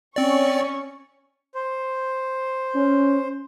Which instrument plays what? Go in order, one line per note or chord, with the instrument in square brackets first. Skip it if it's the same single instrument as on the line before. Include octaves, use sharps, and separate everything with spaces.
[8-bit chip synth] C4 D5 [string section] C#4 C#6
[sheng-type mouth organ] C5
[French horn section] C#4